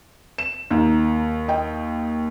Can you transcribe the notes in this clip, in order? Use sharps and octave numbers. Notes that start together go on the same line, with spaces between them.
E7
D#2 D#4
D#5 G5